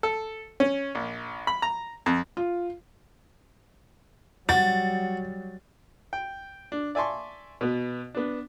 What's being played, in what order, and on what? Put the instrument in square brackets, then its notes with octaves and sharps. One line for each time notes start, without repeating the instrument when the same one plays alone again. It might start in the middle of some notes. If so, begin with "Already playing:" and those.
[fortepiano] A4
C#4
A#1
B5
A#5
F2
[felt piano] F4
[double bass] F#3 G3 [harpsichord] F#4 [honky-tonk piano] A6
[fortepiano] G5
D4
D5 E5 G#5 A5 C6 C#6
B2 B3
B3 D4